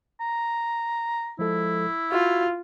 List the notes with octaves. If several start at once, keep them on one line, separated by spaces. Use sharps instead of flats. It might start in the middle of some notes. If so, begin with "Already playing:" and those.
A#5
F3 G#3 E4 A4
F4 F#4